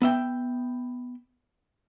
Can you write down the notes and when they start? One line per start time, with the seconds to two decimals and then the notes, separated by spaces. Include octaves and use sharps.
0.02 B3 E5 G5